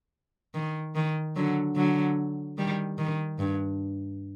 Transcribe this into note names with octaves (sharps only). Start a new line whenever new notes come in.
D#3
D#3
D3 F#3
D3 F#3
D#3 G3
D#3
G2